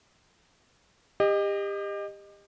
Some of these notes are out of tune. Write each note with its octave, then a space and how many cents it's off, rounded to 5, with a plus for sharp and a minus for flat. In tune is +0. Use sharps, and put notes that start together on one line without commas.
G4 +30 D#5 -15